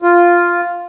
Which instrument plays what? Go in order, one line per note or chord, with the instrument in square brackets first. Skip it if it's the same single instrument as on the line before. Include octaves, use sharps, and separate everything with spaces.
[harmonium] F4